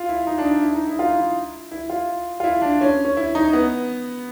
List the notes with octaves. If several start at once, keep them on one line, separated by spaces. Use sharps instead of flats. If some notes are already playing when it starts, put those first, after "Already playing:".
Already playing: F4
E4
D#4
D4
D#4
E4
D#4
E4
F4
E4
E4
F4
F4
E4
D4
C#4
C#4
E4
D#4
B3